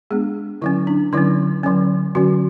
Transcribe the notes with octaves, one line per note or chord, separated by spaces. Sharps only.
G#3 B3 D4 G#4
D3 F#3 C#4 E4
D4
D3 F#3 C#4 E4
D3 F#3 C#4
D3 F#3 C#4 F#4